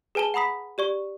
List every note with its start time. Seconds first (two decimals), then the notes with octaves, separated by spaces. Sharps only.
0.15 G#4 B4 G#5 A5 G7
0.34 F#5 A#5 B5 D#6 B6
0.78 G4 D5 C#6